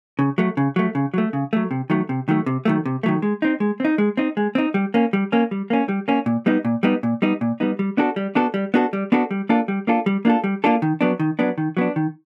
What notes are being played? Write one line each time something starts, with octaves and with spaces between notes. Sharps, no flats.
C#3
F#3 A3
C#3
F#3 A3
C#3
F#3 A3
C#3
F#3 A3
C3
D#3 F#3 A3
C3
D#3 F#3 A3
C3
D#3 F#3 A3
C3
D#3 F#3 A3
G#3
C4 D#4
G#3
C4 D#4
G#3
C4 D#4
G#3
C4 D#4
G3
A#3 C#4
G3
A#3 C#4
G3
A#3 C#4
G3
A#3 C#4
A#2
G3 B3 D#4
A#2
G3 B3 D#4
A#2
G3 B3 D#4
A#2
G3 B3 D#4
G3
B3 D4 F#4 A4
G3
B3 D4 F#4 A4
G3
B3 D4 F#4 A4
G3
B3 D4 F#4 A4
G3
A#3 D4 F4 A4
G3
A#3 D4 F4 A4
G3
A#3 D4 F4 A4
G3
A#3 D4 F4 A4
D#3
F#3 B3 D4
D#3
F#3 B3 D4
D#3
F#3 B3 D4
D#3